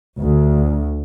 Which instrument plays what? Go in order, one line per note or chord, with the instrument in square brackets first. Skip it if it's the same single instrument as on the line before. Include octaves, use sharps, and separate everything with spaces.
[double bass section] D2